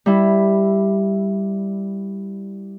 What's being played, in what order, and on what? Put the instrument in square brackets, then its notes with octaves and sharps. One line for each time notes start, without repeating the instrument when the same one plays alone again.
[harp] G3 E4